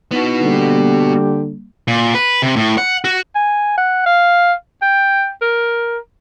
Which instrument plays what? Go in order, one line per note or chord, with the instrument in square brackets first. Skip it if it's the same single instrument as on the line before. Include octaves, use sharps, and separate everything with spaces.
[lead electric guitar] B3 F#4 [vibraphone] D#4 E4 B4
[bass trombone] D3 [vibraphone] G3 A#3 [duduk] G4
[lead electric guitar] A#2
B4
C3
A2
F#5
F#4
[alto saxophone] G#5
F#5
F5
G5
A#4